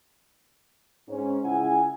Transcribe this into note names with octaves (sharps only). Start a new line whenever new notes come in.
G#2 C#4
C#2 E4 G#4 F#5 G#5